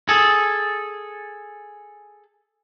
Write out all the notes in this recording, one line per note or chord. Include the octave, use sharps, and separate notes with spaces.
G#4 A4